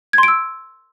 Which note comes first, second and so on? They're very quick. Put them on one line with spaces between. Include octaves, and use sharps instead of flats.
G#6 C6 D7 E6